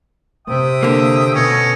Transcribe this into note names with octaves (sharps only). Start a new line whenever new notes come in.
C3 E5 G5 D#6
D3 A#3
B2 A3 C#4 D#5